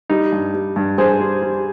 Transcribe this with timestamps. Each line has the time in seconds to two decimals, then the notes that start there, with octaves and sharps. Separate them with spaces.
0.10 G3 D#4
0.32 G2
0.54 G3
0.76 G2
0.98 G2 G#4 C5
1.20 G3
1.42 G3